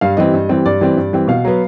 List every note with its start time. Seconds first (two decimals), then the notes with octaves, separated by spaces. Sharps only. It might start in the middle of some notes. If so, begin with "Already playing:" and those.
0.01 G2 F5
0.17 E3 G3 C4 D#5
0.34 G2
0.49 E3 G3 C4
0.66 G2 D5
0.81 E3 G3 C4
0.97 G2
1.13 E3 G3 C4
1.28 B2 F5
1.45 F#3 B3